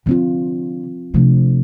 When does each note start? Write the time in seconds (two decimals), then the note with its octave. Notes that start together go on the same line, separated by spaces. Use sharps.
0.06 D3 F3 C4 F4
1.14 C3 F3 A3 D4